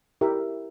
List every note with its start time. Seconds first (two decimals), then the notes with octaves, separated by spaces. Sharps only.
0.21 E4 G4 A#4 E5